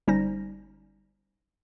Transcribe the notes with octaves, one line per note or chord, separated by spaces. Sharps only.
G1 G3 C#4 D#4 C5 A#6